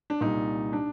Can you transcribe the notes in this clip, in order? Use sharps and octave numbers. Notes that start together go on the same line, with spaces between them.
D4
C2 A#2 D#4
D4